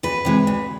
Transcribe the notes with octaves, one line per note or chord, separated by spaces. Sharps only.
D2 B4
C3 E3 G#3
D2